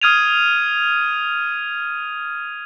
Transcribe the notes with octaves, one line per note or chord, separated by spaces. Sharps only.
D#6 F6 G#6 D#7 F7